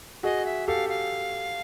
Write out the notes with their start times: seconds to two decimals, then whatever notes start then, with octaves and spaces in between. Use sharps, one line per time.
0.23 F#4 G#4 D#5
0.45 E5
0.68 G4 A4 F5
0.89 F5